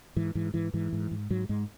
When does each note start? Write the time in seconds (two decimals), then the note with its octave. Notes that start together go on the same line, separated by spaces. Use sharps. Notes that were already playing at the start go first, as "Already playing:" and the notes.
0.16 G#2 E3
0.35 G#2 E3
0.54 G#2 E3
0.74 G#2 E3
0.93 G#2
1.11 G#2
1.30 G#2 F#3
1.49 G#2 G#3